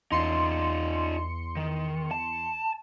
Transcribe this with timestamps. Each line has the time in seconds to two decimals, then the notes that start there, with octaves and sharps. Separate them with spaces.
0.12 E2 D#4 F4 C6 C#7
1.57 D#3
2.11 A5